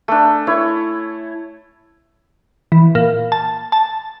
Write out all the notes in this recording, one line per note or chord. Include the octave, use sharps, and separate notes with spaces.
A3 D4
E4 C#5
E3
A#2
A5
A5